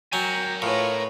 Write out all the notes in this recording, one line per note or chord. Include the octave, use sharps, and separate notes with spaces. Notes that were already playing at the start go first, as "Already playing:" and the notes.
F#3 A#4 G5 G#5
A2 F4 B4 C#5